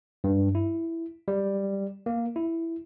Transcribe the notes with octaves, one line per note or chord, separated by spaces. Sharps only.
G2
E4
G3
A#3
E4